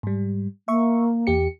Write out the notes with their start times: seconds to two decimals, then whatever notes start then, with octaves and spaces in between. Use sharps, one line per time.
0.03 G#2 G3
0.68 A#3 E5 C#6
1.27 E2 G4 C#7